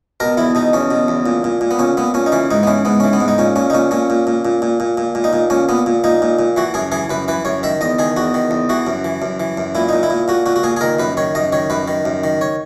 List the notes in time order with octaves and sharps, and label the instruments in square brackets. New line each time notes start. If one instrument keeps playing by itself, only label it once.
[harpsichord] B2 A#4
E2 E4
B2 D#4
E2 C#4
B2
E2
A#2
A#2
A#2
B3
A#2 C#4
A#2 B3
A#2 C#4
D#4
E3 C#4
G#2 D#4
B3
E3 C#4
G#2 B3
E3 C#4
B3
G#2
D#4
A#2 C#4
A#2 C#4
D#4
A#2 C#4
A#2 C#4
A#2
A#2
A#2
A#2
A#2
A#2
A#2
D#4
A#2
A#2 C#4
A#2 B3
A#2
A#2 D#4
A#2
A#2
E3 F#4
F#2 G#4
E3 G#4
F#2 B4
E3 B4
F#2 C#5
D#3 E5
E2 D#5
D#3 G#4
E2 F#4
D#3
E2
E3 F#4
F#2
E3
F#2
E3
F#2
A#2 E4
A#2 D#4
E4
A#2
A#2 F#4
A#2 F#4
F#4
A#2 G#4
G#4
D#3 A#4
F#2 B4
D#3 C#5
F#2 D#5
D#3 C#5
F#2 B4
D#3
F#2
D#3
C#5